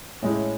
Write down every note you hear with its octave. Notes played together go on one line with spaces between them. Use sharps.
A2 G#3 C#4 E4